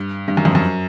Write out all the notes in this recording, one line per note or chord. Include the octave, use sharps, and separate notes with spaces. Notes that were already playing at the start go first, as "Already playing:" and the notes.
Already playing: G2
G2
F#2
F2
F#2